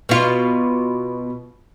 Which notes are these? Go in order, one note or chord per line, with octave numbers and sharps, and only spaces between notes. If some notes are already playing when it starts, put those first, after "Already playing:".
B2 F4